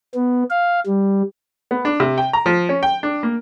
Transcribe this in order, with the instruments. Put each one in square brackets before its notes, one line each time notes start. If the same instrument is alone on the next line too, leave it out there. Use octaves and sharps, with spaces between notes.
[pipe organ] B3
F5
G3
[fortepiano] B3
D4
C3
G5
A#5
F3
C#4
G5
D4
A#3